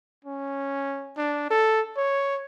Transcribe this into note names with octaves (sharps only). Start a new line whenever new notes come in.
C#4
D4
A4
C#5